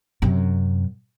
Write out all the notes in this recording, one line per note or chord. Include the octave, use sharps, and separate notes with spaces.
F#2 C3